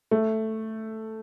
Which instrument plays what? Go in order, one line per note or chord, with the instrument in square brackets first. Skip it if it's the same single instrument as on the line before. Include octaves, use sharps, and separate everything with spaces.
[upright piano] A3